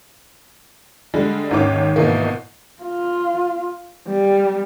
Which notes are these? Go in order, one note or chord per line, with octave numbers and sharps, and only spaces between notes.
D3 G3 G#3
G#1 D#2 G#2 C#4 C#5 D6
G#1 B2 E3 A#3
F4
G3